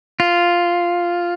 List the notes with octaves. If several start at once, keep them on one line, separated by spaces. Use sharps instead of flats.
F4